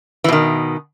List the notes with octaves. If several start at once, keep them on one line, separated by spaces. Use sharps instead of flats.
B2 D#3 E3